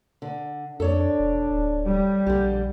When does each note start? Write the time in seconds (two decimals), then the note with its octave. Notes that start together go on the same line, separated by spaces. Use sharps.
0.22 D3
0.80 F2 D4 A4 C#5 D5
1.19 E1
1.51 D1
1.87 G3
2.26 A#1 D3 G4